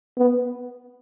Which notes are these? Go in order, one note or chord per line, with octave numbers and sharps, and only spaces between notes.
B3